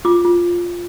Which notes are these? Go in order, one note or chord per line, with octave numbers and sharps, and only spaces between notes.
F4 D6
F4